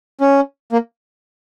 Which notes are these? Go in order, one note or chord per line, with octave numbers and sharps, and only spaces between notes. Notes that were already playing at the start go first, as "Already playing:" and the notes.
C#4
A#3